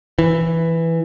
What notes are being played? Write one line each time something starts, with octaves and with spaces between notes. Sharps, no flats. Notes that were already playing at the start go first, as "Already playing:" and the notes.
E3